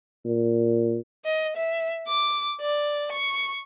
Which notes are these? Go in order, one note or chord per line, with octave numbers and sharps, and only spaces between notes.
A#2
D#5
E5
D6
D5
C#6